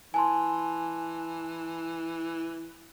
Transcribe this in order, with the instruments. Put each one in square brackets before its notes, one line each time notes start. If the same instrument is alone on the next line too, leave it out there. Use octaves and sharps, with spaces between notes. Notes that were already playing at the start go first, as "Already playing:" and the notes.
[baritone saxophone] E3 [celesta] G#5 A5 C6